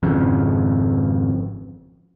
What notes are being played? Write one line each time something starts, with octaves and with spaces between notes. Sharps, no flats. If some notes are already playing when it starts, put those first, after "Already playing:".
G#1 F2 C#3